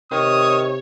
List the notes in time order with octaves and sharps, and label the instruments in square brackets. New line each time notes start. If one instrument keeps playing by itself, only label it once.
[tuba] C3 [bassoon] D#3 [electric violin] C#5 [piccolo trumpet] D#6